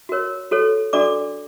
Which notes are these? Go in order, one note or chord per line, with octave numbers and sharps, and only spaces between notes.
F#4 A#4 C#5
F#4 A4 C#5
D4 F#4 A4 D5 D6